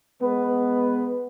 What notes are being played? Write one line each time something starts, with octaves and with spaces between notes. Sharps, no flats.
G#3 B3 B4